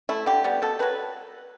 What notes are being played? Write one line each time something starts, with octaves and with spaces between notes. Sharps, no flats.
A3 E4
D3 G4
G3 B3
B2 A4
F#3 A3 B4